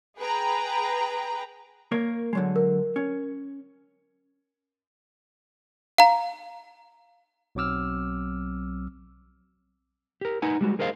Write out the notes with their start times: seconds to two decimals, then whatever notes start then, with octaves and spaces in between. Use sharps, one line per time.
0.19 G#4 B4 G5 A#5
1.92 A#3 A#4 C#5
2.33 D3 F#3 G#3
2.56 A#4
2.96 C#4
5.98 F5 A#5
7.55 B1 F#3 C4 D6 E6 F6
10.21 G4 A#4
10.42 D#4 B4 F#5 G#5
10.61 G3 G#3 F#4
10.79 G#4 A#4 C5 D#5 F5